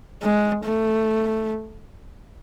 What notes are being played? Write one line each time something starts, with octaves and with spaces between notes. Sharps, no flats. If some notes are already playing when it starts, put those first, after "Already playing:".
G#3
A3